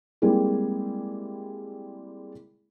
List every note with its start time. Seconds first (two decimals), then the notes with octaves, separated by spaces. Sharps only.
0.22 G3 G#3 A#3 C4 E4 G#4